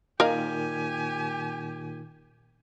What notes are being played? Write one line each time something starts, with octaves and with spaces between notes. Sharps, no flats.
A#2 D#3 G4 A#4 D#5 F5 G#5